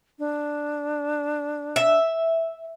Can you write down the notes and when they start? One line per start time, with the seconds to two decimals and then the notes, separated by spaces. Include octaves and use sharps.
0.19 D4
1.76 E5